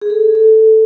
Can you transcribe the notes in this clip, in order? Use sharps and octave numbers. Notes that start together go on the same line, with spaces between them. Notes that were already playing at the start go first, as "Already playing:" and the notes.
G#4
A4
A4